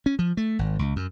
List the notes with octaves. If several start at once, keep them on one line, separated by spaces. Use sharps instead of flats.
C#4
F3
A3
G#1
C#2
F#2